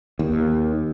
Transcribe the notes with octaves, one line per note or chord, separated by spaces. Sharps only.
D#2